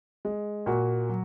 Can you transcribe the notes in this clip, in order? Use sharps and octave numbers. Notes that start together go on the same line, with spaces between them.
G#3
A#2 F#4
F#3